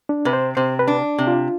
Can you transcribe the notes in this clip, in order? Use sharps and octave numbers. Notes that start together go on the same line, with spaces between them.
D4
C3 B4
C5
C3 C5
B4
D4
C3
F4